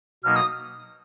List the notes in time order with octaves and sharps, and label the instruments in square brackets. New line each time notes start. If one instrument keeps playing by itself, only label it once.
[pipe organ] B2 F#3 A#3 D#4 [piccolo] F6
[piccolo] D#6